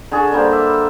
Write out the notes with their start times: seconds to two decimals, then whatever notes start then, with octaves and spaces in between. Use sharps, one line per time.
0.12 D3 G#4 A5 C#6
0.32 D3 G3 A#3 C5
0.53 E5